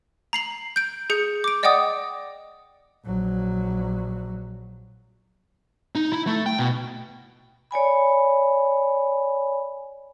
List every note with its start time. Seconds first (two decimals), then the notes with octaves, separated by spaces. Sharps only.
0.33 A#5 C7 F#7
0.76 G6 D7
1.10 G#4 G6 C#7
1.44 D6 D7
1.63 D5 D#5 F#5 G5 D6 D#6
3.05 A#1 F#3
5.95 D#4
6.12 E4
6.27 A3
6.46 G5
6.59 B2
7.71 C#5 D5 G#5 B5